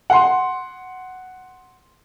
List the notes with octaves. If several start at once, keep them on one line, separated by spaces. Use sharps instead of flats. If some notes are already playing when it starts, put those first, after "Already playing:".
F#5 C6